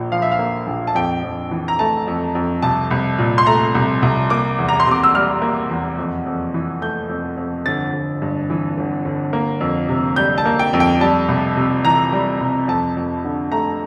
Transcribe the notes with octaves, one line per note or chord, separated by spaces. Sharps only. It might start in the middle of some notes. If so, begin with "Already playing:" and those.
Already playing: A#1 A#2 A#3
F3 F5
E5
F5
A#3
A#1
A5
F2 G5
F2
E3
A#5
A3 A5
F2
F2
C2 A5
C2
A#2
C6
A3 A#5
C2
C2
A#3 D6
E2
A#5
C6
C3 D6
E6
G3 F6
A#3
E2
F2
F2
E3
A3 G6
F2
F2
G1 A6
G1
G2
E3
G1
G1
A#3
F2
C3
G3 G6
A5
A#3
G5
F2
G5
G3 A5
C2
C3
E3 A#5
G3
C2
F2 A5
F2
D3
A3 A#5